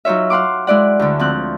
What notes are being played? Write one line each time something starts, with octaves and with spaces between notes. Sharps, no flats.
F#3 D#4 F4 C#5 E5
F5 F#5 C6 D6
G#3 E4 D5 F#5
D2 D3
F3 C4 F#6